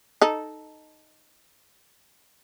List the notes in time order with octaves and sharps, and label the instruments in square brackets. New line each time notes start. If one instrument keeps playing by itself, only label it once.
[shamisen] D#4 A4